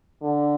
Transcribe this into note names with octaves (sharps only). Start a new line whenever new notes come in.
D3